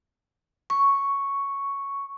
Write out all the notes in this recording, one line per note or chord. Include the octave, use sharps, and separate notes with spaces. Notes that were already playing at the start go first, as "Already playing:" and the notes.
C#6